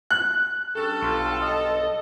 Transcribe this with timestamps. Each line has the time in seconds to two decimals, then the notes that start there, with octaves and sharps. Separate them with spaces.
0.11 F#6
0.76 G2 C#4 A4
1.02 B1 F4
1.41 D#5